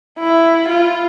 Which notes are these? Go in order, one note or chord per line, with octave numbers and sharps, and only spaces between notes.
E4
F4